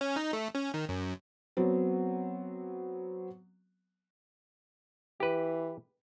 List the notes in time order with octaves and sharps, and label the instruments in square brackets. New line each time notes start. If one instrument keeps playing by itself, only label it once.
[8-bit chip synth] C#4
D#4
A3
C#4
D#3
F#2
[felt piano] F#3 B3 C4
[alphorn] E3 [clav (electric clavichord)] G4 B4